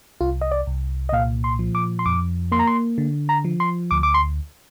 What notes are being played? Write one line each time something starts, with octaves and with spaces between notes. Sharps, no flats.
C2 F4
D#5
D5
C2
D#5
A#2 F5
C6
F3
D6
C6
F2 D6
A#3 C6
A#5
C6
D3
A#5
F3
C6
D2 D6
D6
C6